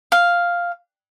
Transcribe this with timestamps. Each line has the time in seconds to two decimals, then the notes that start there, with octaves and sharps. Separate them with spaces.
0.12 F5